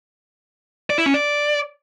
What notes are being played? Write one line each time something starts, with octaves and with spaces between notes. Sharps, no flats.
D5
E4
C#4
D5